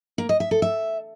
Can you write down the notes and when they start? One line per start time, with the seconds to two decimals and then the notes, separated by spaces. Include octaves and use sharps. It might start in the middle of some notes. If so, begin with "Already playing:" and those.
0.18 A#3
0.29 D#5
0.40 E5
0.51 A4
0.62 E5